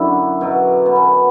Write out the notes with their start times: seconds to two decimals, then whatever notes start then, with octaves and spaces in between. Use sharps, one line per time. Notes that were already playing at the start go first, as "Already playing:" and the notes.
Already playing: F#2 D3 F#3 D4 E4 F#4
0.41 B2 F#3
0.86 B3
0.96 C#4